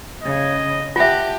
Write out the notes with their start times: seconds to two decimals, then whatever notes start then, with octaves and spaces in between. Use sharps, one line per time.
0.23 C#3 D#5
0.96 F4 G4 E5 F#5 A5